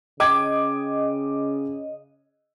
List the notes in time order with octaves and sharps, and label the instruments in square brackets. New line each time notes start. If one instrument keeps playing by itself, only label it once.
[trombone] C#3 [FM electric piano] D#5 [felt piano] G5 D6 G#6